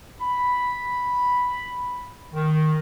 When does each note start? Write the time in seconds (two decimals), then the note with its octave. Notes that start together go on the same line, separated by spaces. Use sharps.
0.21 B5
2.33 D#3